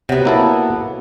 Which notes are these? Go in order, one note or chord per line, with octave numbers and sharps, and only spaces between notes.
C3 F#3 B3
A#3 E4 A4